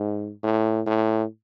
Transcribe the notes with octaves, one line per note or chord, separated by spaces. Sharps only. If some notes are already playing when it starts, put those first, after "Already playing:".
Already playing: G#2
A2
A2